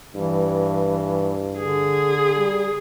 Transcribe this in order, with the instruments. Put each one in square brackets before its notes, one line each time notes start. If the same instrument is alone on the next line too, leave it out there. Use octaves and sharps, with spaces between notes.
[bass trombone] G2 [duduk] E3
[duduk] D3 [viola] G#4
[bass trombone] G3